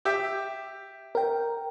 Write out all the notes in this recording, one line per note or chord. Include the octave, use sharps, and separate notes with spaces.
G4 E5
A#4 G5